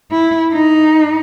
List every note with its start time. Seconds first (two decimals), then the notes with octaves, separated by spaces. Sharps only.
0.11 E4
0.53 D#4